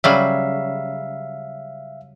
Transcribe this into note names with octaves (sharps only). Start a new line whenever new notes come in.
C#3 F#3 G3 E5 F5